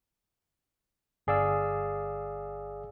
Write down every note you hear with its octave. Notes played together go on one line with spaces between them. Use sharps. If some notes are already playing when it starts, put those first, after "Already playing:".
G1 G#4 D5 F5 E6